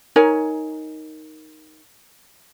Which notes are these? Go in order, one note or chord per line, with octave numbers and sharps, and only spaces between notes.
D#4 A#4 C#5 G#5